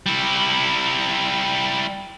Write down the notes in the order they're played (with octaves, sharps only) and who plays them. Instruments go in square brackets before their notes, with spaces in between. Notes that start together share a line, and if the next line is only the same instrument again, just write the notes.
[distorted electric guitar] G3 E4